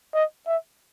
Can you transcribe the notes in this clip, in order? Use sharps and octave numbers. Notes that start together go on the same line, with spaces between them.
D#5
E5